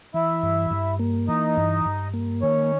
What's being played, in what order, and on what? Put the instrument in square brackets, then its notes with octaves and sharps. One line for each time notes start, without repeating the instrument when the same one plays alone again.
[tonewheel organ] E3 [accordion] E4 E5
[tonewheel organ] G2
G2
A#3
[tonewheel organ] E3 [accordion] D#4 D#5
[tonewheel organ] G2
G2
A#3
[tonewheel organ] D#3 [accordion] C#4 C#5